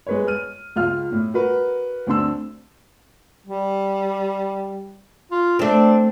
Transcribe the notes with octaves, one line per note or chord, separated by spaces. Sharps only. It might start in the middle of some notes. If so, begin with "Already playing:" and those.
G#3 B4 C#5
F6 D#7
C#2 F4 F6
A2
F#4 A#4 B4
D2 C4 D4 C6 E6
G3
F4
A3 C4 D4